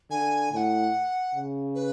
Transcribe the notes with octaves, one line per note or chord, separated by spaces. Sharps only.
D3 G#5
A2 F#5 G#5
C#3
B4